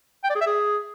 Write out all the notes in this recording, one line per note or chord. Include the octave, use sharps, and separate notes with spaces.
G5
D5
G#4
E5
G#4